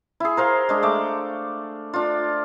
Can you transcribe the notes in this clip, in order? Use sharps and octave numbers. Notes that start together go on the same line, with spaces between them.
E4 G#4
A#4 C5 F5
G#3 D4
A3 D6
D4 F4